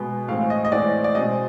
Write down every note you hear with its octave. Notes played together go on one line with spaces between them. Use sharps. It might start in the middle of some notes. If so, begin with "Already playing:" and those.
Already playing: B2 G#3 B3
A2 E3 G#3 C4 F5
D#5
D#5
A2 E3 G#3 C4 D5
D5
B2 G#3 C4 D#5